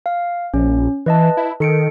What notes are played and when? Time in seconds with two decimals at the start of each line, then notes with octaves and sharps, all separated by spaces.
0.06 F5
0.54 A#1 C#4
1.06 E3 B4 D#5 A5
1.37 E4
1.60 D#3 A4 C#7 D7